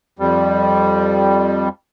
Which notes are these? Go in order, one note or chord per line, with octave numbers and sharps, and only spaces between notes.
F2 G3